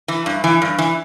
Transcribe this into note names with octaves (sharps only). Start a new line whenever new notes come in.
E3
G2
E3
G2
E3